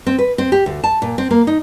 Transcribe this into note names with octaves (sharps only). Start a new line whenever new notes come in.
C4
B4
C4
G4
D2
A5
A#2
C4
A#3
D#4